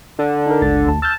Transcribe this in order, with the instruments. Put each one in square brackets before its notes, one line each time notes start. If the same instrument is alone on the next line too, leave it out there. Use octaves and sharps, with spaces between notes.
[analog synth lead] D3
[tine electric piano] D#4 A#4
G1 C#2 A6
D2 A5
[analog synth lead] A5 [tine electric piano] E6 F6 G6